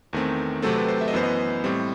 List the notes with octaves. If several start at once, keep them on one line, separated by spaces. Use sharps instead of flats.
E2 D#3 A3 C4
C3 F#3 A3 C4 A4
B4
C5
E5
D#5
F#2 E3 B3 C5
D#5
A2 G3 C4